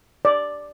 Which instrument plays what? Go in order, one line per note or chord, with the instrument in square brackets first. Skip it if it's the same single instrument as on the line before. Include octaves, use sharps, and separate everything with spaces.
[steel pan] D5